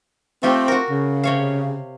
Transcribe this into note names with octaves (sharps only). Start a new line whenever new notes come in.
A3 C4 F4 G4
F#4 A#4
C#3
C3 C#5 F5